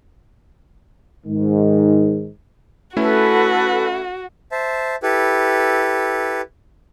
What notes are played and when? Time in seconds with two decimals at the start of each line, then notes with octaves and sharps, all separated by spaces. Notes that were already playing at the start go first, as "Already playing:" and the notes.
1.27 G#2 D#3
2.97 A3 C#4 E4 F#4 A4 B4
4.52 C5 E5 A5
5.03 E4 G4 A4 B4